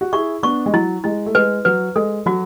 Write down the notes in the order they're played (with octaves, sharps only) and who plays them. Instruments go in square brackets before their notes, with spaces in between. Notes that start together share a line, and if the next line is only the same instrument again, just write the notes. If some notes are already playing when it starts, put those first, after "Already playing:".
[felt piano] F#4
[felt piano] E4 G#4 [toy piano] C#6
[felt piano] B3 D4 [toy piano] C#6
[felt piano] G#3
[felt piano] F#3 [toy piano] E4
[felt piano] G#3 [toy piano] E4
[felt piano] A3
[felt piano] G#3 [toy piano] B4
[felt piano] F#3 [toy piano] B4
[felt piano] G#3 [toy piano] A4
[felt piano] F#3 [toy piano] F#4